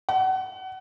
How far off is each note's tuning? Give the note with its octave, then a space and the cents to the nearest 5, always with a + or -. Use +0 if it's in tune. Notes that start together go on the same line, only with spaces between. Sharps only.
F#5 +30